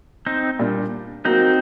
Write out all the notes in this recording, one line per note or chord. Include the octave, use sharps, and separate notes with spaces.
C4 D#4
A#2 G3 D4
F#3 A#3 C4 D#4 F#4